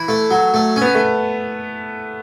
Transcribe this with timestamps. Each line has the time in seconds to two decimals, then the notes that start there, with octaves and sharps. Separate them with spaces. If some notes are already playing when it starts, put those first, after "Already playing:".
Already playing: E3 E4
0.08 A3
0.31 F#3
0.54 A3
0.76 C#4
0.82 B3
0.95 A3